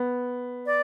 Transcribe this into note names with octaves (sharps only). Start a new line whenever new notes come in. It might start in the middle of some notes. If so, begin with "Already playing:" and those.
Already playing: B3
D5